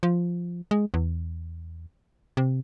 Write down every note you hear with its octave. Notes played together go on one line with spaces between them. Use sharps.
F3
G#3
E2
C3